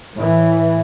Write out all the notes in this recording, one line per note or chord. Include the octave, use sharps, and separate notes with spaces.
A2 E3